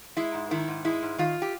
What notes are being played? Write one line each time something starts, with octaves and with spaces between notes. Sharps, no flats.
G#3 E4
G#2
D#3 E4
G#2
G#3 E4
G#2
D#3 F4
G4